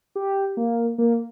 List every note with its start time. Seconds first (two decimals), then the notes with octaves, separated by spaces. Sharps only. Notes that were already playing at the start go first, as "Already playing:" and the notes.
0.15 G4
0.57 A#3
0.98 A#3